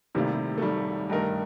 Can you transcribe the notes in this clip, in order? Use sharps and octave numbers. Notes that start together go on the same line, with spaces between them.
A#1 A2 C3 D#3 G3 A#3
A3
D#3 G3
G2 D#3 A3 D#4 A#4